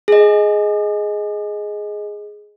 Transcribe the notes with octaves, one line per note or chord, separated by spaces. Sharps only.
G#4 D#5